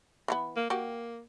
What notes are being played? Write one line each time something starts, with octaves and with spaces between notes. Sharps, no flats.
E3 F3 B3
A#3
A#3 F#4 G4